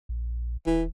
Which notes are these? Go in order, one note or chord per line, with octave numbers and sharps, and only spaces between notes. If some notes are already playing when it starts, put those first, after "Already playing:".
A#1
D#1 E3